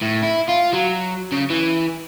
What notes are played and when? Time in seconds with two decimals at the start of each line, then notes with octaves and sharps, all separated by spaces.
0.02 A2
0.23 E4
0.49 F4
0.73 F#3
1.32 C#3
1.50 E3